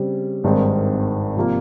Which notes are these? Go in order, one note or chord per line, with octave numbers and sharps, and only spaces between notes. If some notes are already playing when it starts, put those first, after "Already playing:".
Already playing: C#3 G3 C4
G#1 G2 D#3 G#3 C4
C3 F3 A#3 F4